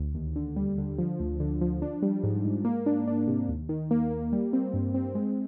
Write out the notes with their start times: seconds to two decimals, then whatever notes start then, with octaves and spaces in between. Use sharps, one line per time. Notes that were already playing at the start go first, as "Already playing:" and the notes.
Already playing: D2
0.15 D#2
0.36 D3
0.56 G3
0.78 D3
0.99 F3
1.20 D2
1.40 D3
1.61 F3
1.82 D4
2.02 G3
2.23 G#2
2.45 G#2
2.65 A#3
2.86 D4
3.08 D4
3.27 C3
3.48 D#2
3.69 D#3
3.91 A#3
4.11 A#3
4.33 G3
4.53 C4
4.74 G2
4.94 C4
5.15 G#3